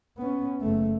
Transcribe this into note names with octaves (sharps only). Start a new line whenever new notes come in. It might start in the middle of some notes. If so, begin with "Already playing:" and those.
B3 C#4
F#1 A3